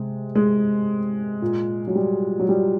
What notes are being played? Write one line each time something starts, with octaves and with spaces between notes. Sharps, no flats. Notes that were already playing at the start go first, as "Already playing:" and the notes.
Already playing: C3 G#3
G#3
A#2
F#3
G3
F#3
G3